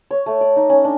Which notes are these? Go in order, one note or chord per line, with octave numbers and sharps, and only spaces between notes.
C#5
A3
D5
D#4
C#4
D4